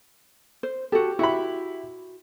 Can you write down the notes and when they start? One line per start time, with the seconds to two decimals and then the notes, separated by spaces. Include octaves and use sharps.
0.63 C5
0.92 F#4 G4 A4
1.19 E4 F#4 G4 B5